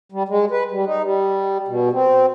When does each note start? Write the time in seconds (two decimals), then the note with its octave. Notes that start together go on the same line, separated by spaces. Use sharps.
0.12 G3
0.29 G#3
0.51 B4
0.71 G3
0.86 D#4
1.03 G3
1.68 B2
1.93 C4